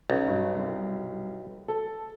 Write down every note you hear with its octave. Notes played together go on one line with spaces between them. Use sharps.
B1 F#3 C#4
G2
C2
A4